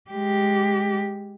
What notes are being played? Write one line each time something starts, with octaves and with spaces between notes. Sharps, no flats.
G#3 G4